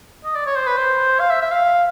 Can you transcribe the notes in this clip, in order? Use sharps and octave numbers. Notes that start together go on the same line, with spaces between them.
D#5
D5
C#5
C5
B4
C5
F5
E5
E5
F5